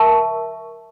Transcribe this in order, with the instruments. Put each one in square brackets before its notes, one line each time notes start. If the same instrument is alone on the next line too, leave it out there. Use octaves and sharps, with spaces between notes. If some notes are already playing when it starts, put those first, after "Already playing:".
Already playing: [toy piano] A#4 E5 A5 C#6